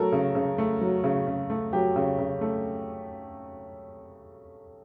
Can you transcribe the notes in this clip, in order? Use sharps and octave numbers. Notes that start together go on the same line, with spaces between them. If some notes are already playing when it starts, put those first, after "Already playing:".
Already playing: F#3 A3 A4 A#4
C#3
C#3
A3
F#3
C#3
C#3
A3
F#3 G4
C#3
C#3
A3